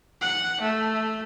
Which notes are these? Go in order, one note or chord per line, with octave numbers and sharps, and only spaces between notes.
F#5
A3